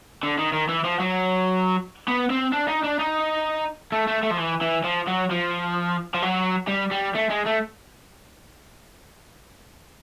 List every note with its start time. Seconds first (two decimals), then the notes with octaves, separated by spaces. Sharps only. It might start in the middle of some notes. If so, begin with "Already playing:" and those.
0.23 D3
0.38 D#3
0.53 D#3
0.69 E3
0.84 F3
1.00 F#3
2.08 B3
2.30 C4
2.53 D4
2.69 D#4
2.84 D4
2.99 D#4
3.92 A3
4.07 A3
4.23 A3
4.31 F3
4.37 E3
4.61 E3
4.84 F3
5.07 F#3
5.30 F3
6.14 F3
6.22 F#3
6.68 G3
6.91 G3
7.15 A3
7.30 G#3
7.46 A3